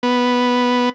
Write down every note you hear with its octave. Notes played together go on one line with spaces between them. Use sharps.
B3